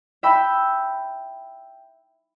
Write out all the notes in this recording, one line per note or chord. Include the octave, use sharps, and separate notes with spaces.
E5 G5 B5 E6